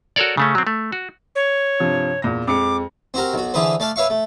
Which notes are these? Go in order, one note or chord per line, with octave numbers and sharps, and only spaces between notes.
F#4 A4 A#4 C#5 D5
C#3 A3 C#4
F#3 C4
A3
F#4
C#5
G2 C3 F3
E2 A#2 A#6
F2 G#3 D6 C#7
C4 F#4 G4 A#4
B1 F#4
D3 E3 G#4 B4 C5
A3 D5 F5 A5
B4 C#5 E5 F5 C#6
A3